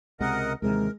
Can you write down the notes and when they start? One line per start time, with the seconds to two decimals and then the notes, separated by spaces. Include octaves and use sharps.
0.20 C#2 C3 G#3 A#4 D#5 F#5
0.62 D#2 C3 E3 G#3 A#4